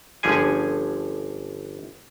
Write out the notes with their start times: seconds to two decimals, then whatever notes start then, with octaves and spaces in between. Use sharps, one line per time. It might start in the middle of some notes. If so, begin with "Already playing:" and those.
0.23 G1 D3 F3 C#4 G#4 G#5